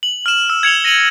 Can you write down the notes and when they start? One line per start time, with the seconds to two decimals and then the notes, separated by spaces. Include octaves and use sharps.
0.03 F#7
0.26 F6 E7
0.50 E6
0.63 G#6 C#7 F7 G7
0.85 A#6 D#7 F7 F#7